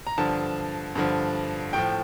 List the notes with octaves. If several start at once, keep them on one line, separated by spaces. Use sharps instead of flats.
A#5
G2 D3 F3 A5
G2 D3 F3
A2 F3 G5